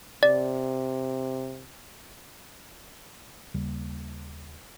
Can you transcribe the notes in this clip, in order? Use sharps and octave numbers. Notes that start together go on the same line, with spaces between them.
C3 D5
D#2 C#3 G3 A#3